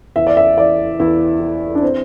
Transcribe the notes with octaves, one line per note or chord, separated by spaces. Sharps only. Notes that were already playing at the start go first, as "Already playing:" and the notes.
E2 E5
D5
E5
E3 D5
E2 E4
E3
D4
C4